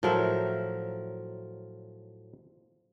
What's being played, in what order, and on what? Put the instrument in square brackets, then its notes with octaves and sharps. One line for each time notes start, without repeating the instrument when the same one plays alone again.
[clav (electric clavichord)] A2 F#3 [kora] F3 A#4 E5